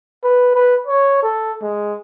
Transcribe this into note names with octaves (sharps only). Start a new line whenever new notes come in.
B4
B4
C#5
A4
G#3